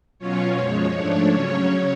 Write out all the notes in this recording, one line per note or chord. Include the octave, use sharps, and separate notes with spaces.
B2 F#3 C#4 F4 C#5
F#2 F3 G#3 C#5
G#2 F3 A3 D4
C#3 F#3 C#4 C#5